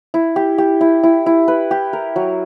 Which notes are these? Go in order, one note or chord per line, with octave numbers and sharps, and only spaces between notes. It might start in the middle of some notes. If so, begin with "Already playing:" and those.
E4
G4
G4
E4
E4
E4
B4
G4
A#4
F#3